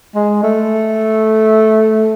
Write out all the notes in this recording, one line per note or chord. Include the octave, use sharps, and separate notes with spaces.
G#3
A3